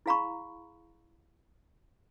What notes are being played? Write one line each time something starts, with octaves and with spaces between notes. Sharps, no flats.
E4 G#4 F5 A#5 B5 C#6